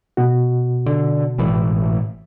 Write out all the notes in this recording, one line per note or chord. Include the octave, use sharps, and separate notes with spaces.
B2 F#4
D3
G#1 A2 E3